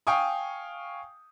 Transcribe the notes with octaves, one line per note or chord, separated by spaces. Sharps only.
F5 G5 G#5 C#6 D#6